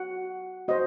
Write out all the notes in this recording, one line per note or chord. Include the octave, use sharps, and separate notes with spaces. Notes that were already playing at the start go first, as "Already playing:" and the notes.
Already playing: F#4 F#5
F#4 C5 D#5